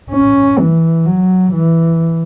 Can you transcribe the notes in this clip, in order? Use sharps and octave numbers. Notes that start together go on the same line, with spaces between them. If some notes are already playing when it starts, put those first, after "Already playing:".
C#4
E3
F#3
E3